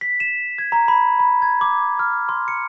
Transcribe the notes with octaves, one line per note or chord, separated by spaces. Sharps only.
B6
E7
G#6
A#5
B5
B5
G#6
D6
F6
C6
C#7